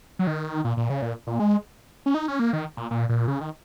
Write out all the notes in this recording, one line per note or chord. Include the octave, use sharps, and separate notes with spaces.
F#3
D#3
A#2
A#2
C#3
A#2
A#2
G#3
C#4
D#4
C#4
A#3
D#3
A#2
A#2
A#2
C#3
D#3